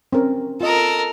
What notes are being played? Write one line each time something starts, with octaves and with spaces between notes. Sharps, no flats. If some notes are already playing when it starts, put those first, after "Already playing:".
C4 C#4 A#4
F4 A4 A#4 D#5